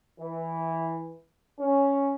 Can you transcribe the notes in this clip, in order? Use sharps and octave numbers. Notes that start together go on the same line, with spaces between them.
E3
C#4